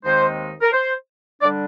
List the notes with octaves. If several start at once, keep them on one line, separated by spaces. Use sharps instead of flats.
D#2 D#3 G#3 C4 D#4 C5
A#4
C5
D3 G3 D4 D5